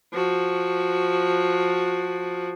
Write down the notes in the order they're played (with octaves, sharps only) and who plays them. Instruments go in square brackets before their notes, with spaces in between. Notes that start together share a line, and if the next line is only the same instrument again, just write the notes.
[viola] F3 F#4